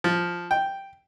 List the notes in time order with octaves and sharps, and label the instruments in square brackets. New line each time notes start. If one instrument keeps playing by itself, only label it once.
[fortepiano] F3
G5